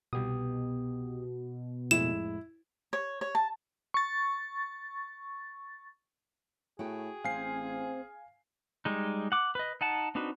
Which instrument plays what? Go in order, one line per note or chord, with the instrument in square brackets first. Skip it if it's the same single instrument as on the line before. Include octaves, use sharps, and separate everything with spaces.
[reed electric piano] C2 G4 D#6 [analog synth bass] B2
[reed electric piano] F2 A2 G#3 [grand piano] E4 [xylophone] E7
[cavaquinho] C#5
C#5
A5
[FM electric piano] C#6 A6
[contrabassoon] A2 [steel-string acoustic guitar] F#4 G5 [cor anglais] G#4
[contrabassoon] A1 [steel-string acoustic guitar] C4 C5 [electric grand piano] F5 G#5 C7
[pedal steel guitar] G3 G#3 D#4
F#5 D6
B4 D#5
D#4 F#5 A5
C4 D4 D#4 F#4 B4